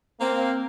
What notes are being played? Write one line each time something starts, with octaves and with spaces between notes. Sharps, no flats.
A#3 C4